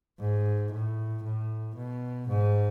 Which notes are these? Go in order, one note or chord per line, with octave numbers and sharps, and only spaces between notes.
G#2
A2
A2
B2
G#2